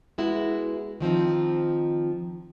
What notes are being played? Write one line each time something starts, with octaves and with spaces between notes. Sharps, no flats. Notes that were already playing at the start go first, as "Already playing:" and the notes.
G#3 B3 E4 F#4
D#3 F3 C4 D#4